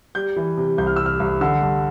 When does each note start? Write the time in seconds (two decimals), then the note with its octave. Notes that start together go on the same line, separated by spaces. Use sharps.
0.15 G3 G6
0.36 E3
0.57 C3
0.78 C2 G6
0.87 F6
0.96 C3 E6
1.06 F6
1.20 C2
1.41 D3 E6
1.62 G2